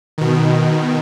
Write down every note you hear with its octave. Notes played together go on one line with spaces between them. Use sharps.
B2 D#3